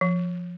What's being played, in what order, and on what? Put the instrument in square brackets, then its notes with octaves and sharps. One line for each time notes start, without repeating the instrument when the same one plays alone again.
[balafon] F3